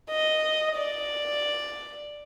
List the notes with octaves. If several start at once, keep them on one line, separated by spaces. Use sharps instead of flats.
D#5
D5